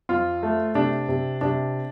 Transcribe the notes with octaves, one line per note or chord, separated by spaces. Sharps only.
F2 F4
A3
C3 D4
C3
C3 D4